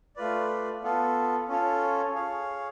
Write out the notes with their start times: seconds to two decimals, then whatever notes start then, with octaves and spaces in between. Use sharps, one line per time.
0.16 A3 F4 B4 D5
0.83 B3 F4 A4
1.48 C#4 F4 A4 C#5
2.15 G#4 C#5 F5